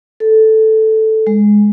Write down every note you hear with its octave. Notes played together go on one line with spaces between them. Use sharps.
A4
G#3